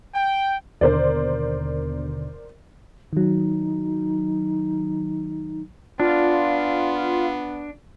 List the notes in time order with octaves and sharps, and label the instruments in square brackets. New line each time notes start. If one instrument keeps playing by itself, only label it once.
[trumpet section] G5
[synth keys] D#2 B2 D3 [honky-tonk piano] A#4 C5 D5
[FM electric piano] D#3 F#3 [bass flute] D#4
[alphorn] B3 [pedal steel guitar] D4 [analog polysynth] F4